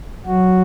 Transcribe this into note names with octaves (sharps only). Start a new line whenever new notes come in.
F#3 F#4